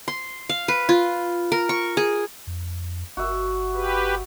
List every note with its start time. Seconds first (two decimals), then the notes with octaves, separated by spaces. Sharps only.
0.08 C6
0.49 F5
0.68 B4
0.89 F4
1.52 A#4
1.69 C#6
1.97 G#4
2.47 F2
3.17 G1 F#4 E5
3.74 G4 B4